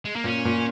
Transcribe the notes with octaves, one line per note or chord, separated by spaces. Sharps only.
G#3
A#3
A#2 C#4
A#2